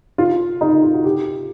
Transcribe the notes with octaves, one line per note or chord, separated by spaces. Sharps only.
F4
D#4
F4
F#4
G4